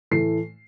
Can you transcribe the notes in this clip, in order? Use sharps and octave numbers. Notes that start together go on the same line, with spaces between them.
A2 E3 A3 C7